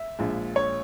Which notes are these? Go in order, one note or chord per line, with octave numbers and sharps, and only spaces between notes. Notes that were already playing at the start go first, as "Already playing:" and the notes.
Already playing: E5
A#1 A#2 G#3
C#5